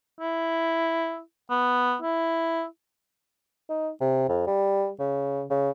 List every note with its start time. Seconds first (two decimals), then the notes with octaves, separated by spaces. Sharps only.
0.20 E4
1.50 B3
2.02 E4
3.69 D#4
4.01 C3
4.28 F2
4.47 G3
4.99 C#3
5.50 C#3